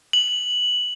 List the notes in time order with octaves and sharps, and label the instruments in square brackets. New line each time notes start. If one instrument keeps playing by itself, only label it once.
[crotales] F#7